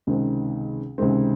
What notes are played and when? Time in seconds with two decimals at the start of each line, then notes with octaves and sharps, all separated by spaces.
0.07 C#2 C3 D#3 G#3 C4
0.98 C#2 C3 D#3 G#3 C4